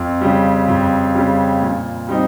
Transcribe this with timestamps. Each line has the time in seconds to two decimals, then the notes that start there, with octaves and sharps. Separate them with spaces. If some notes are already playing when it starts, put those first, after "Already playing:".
Already playing: F2
0.21 C#3 G3
0.68 F2
1.14 C#3 G3
1.62 A#2
2.08 G3 C4 D#4